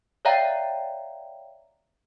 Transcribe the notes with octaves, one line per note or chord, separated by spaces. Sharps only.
C#5 D5 E5 F5 G5 A#5